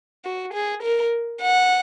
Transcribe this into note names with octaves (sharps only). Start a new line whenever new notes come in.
F#4
G#4
A#4
F#5